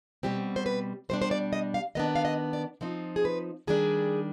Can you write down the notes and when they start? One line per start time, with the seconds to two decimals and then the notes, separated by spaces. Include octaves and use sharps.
0.23 B2 G3 C4 G4
0.56 C5
0.66 B4
1.09 B2 G3 D4 C5
1.22 C5
1.31 D5
1.53 D#5
1.74 F5
1.95 D#3 B3 D4 D#5
2.15 F5
2.25 D#5
2.53 D5
2.81 F3 C4 D#4
3.16 G#4
3.25 B4
3.67 D#3 G3 D4 G#4